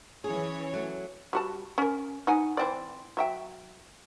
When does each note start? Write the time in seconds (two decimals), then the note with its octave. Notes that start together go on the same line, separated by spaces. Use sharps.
0.24 E3 C#4 G#4 C#5
0.73 F#3 A3
1.33 G3 F#4 A5
1.78 C#4 A#4
2.27 D#4 F#5 G#5
2.57 E3 C4 D5
3.17 F#3 E5 G5